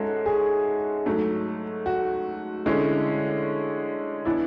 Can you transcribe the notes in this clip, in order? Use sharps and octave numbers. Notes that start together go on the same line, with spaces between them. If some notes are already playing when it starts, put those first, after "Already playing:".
Already playing: G#2 G#3 C#4 F#4 A4 E5
G#4
G#2 F#3 A3
F#4
D3 G#3 C#4 E4
E3 B3 D4 E4